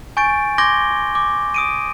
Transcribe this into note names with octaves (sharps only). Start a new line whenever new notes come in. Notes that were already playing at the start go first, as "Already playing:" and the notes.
G#5 C#6 G6 A6 D7
C6 D6 G6 G#6 A#6 G7
D6
D#6 D7 D#7